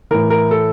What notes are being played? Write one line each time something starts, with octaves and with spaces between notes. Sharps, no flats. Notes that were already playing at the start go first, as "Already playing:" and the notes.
A2 E3 A#4
A#4
A4